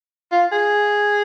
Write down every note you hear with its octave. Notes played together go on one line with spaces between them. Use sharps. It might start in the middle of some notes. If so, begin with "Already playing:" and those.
F4
G#4